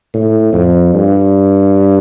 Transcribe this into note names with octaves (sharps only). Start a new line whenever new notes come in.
A2
F2
G2